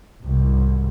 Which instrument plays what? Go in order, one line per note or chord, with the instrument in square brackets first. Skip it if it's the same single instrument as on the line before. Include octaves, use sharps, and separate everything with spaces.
[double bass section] C2 G#2 B2